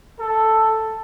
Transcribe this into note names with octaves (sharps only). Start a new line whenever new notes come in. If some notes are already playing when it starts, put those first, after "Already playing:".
A4